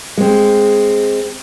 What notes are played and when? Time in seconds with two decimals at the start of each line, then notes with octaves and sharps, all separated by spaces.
0.17 G#3 C4